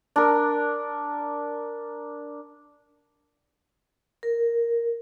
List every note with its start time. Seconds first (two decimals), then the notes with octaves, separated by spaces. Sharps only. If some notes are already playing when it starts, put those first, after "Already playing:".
0.16 D4 A#4
4.23 A#4